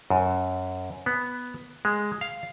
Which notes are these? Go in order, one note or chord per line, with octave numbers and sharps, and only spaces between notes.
F#2
B3
G#3
F5